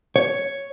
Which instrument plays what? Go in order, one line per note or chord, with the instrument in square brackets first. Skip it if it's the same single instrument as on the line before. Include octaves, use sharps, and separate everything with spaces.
[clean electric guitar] C#5